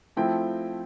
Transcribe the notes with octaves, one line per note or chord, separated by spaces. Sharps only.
F3 A3 C4 E4 G5